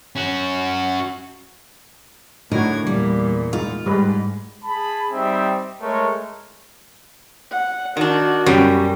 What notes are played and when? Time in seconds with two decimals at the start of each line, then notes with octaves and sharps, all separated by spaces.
0.16 C#4 F#4
2.52 A2 D3 D#4 F#4 A#4 G#6
2.87 E2 A#2 G3
3.53 G#3 D#4 F4
3.86 G#2 G3 G#3 B4
4.64 G#4 A5 B5
5.11 G3 C4 D#4 E5
5.81 G#3 A3 A#4 C#5
7.51 F#5
7.97 D#3 D4 F#4
8.46 F#2 B2 G3 G5